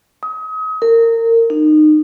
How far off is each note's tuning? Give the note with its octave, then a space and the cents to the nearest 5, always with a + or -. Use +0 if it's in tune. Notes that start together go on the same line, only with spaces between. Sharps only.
D#6 +35
A#4 -25
D#4 -25